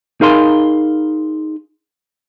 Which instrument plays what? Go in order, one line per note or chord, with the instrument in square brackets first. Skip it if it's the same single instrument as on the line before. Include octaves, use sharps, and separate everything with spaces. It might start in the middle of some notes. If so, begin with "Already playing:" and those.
[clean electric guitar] D#4 G#4 A#4 F5 B5 C6